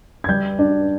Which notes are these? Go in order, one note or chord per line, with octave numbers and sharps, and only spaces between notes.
G#6
G3 G6
D4